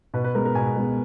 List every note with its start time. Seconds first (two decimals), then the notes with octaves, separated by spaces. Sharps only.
0.14 B2 B4
0.24 B4
0.35 G#3 A#4
0.38 B3
0.45 A#4
0.55 B2 G#5
0.76 G#3 B3